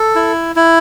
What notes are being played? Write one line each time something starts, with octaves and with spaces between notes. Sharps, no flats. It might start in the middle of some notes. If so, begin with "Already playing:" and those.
Already playing: A4
E4
E4